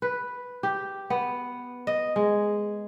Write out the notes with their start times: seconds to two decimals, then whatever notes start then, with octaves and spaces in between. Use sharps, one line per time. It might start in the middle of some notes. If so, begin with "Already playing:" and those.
0.02 B4
0.63 G4
1.10 B3
1.87 D#5
2.16 G#3